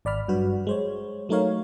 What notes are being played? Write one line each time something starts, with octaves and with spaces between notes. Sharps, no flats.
G#1 D5 B5 F6
G2 F#3 F#4 B4
G#3 C5 C#5
F#3 A3 D#4 A#4 C#5 F5